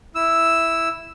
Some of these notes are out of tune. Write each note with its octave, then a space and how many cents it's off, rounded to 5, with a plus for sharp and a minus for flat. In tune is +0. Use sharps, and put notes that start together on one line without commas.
E4 +0 E6 +0